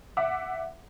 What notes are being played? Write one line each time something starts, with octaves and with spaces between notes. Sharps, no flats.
E5 F#5 D6